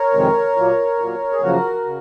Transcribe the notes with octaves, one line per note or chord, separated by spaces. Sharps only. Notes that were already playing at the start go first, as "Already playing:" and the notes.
Already playing: A#4 C#5
F2 C3 D#3 G#3 C4
A#2 F#3 A#3
A#2 F#3 A#3
G#4
F#2 C#3 F3 A#3 F#4 A#4
C#3